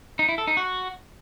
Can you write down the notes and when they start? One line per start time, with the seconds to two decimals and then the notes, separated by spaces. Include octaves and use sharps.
0.19 D#4
0.29 E4
0.38 A4
0.47 D#4
0.57 F#4